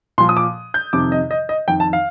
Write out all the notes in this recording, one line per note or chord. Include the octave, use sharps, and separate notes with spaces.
A#2 F3 C6
D#6
D6
G6
F2 C3 D#3 D6
D#5
D#5
D#5
F2 D#3 G5
A5
F5